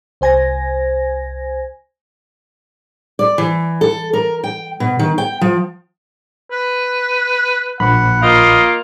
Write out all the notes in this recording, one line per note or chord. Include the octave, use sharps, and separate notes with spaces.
C2 C5 G#5 G#6 A#6
D5
E3
A4
A#4
G5
B2
D#3
G5
F3
B4
A#1 F#5 B5
A#3 F4 D#5